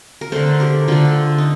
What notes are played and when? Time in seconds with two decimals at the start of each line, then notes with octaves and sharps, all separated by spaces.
0.21 A#4
0.32 D3 A3 A4 C5
0.60 G4 A#4
0.88 D3 A3 F4 A4
1.38 D#4